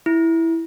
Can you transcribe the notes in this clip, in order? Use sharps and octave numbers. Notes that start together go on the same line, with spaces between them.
E4